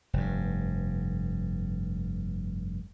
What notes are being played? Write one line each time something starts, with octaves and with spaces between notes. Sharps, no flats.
F1 G2